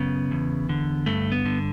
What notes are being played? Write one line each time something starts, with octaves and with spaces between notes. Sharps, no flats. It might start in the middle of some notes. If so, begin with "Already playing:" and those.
Already playing: F#2 C#3 B3
E2
D3
G2 A3
B3
D3